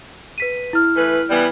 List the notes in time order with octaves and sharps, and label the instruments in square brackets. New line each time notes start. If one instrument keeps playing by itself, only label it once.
[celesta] B4 B6 D#7
E4 F6
[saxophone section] E3 A3 B4
E3 G3 B3